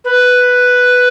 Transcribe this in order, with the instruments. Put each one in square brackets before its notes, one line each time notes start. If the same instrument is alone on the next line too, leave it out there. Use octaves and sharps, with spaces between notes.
[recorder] B4